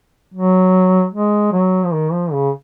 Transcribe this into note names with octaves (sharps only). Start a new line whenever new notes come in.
F#3
G#3
F#3
F3
D#3
F3
C#3